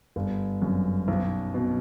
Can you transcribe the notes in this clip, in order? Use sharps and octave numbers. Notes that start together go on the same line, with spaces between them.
G1
F#2
B1
B2